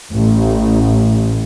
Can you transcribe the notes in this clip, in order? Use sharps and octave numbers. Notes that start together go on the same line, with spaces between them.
A1